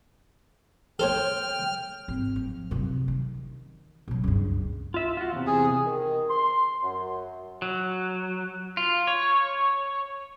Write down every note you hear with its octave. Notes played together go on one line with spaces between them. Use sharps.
A4 C5 C#5 G5 F6
G#1
F3
F#2 C3
D#3
B2 F#3
C#2 G2
F4 E5
F4 F#4
E2 C3
G#4
D#3
C6
F#2
F#3
F4
C#5